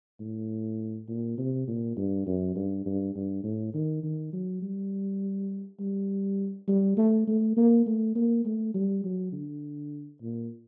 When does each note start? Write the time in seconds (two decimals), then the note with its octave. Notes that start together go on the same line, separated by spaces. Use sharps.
0.20 A2
1.08 A#2
1.38 C3
1.68 A#2
1.97 G2
2.26 F#2
2.55 G2
2.86 G2
3.15 G2
3.44 A2
3.74 D#3
4.03 D#3
4.33 F#3
4.62 G3
5.79 G3
6.68 G3
6.97 A3
7.28 A3
7.56 A#3
7.86 A3
8.15 A#3
8.45 A3
8.74 G3
9.04 F#3
9.32 D3
10.22 A#2